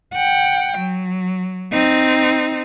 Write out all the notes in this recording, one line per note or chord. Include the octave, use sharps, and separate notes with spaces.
F#5 G5
F#3
C4 D#4